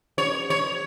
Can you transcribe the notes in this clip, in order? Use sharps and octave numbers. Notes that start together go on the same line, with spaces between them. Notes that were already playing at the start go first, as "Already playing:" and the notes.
C#5
C#5